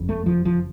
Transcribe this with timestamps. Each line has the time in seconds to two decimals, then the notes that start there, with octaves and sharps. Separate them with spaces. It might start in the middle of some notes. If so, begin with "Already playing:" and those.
Already playing: F#1 F2 C#3
0.09 A3
0.26 F3
0.45 F3